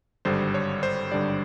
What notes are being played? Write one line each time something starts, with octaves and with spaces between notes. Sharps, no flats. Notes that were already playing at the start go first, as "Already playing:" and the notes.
G#1 G2 D3 G3 C5
C#5
C5
G#1 G2 D3 G3 D5